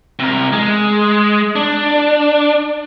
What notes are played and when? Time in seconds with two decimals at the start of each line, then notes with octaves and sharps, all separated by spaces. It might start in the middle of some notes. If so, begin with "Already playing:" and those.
0.19 C3 A#4
0.52 G#3
1.56 D4